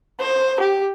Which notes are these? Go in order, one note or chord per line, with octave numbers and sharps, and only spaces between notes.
C5
G4